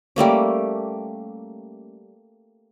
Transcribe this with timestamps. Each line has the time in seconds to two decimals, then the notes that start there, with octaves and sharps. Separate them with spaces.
0.16 G3 A3 A#3 C#4